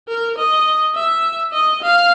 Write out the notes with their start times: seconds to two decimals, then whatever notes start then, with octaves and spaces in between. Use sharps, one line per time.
0.08 A#4
0.38 D#5
0.95 E5
1.53 D#5
1.82 F5